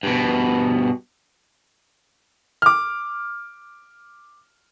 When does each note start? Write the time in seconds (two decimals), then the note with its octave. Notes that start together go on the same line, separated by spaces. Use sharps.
0.03 G2 B2
2.62 D6 F6